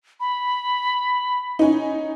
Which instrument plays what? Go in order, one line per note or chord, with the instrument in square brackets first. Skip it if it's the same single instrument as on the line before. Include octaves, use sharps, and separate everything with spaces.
[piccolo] B5
[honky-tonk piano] C#4 D#4